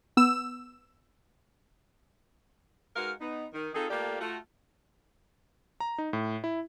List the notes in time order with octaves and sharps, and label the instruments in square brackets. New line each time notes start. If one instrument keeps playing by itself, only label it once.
[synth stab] B3 E6 E7
[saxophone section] G#3 D#4 F#4 A#4 B4 F5
B3 D#4
D#3
C4 D#4 F4 G#4 A4
A3 A#3 F4 G4 A4 D5
A3 F4 F#4
[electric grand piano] A#5
D#4
A2
E4